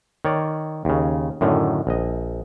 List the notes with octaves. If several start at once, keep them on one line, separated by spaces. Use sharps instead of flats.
D#3 C#5 D5
D#2 C#3
F#2 A2 D3 D#3
A#1 D#5